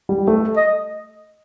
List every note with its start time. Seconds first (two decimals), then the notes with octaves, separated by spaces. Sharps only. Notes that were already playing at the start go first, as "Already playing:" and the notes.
0.09 G3
0.28 A3
0.57 D#5